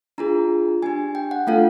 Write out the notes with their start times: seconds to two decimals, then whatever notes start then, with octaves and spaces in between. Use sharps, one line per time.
0.18 D4 F4 G#4 A#5
0.82 D4 G4 G#5
1.15 G5
1.31 F#5
1.47 A3 D4 F4 A4 F5